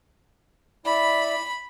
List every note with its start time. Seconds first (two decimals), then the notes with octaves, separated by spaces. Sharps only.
0.85 E4 D5 B5